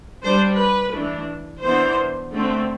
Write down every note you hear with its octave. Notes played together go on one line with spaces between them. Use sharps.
G3 D4 C5
B4
E3 A3 D4
E3 B3 D4 C5
D3 A3 C4